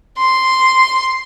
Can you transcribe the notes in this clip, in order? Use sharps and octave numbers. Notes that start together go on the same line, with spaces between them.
C6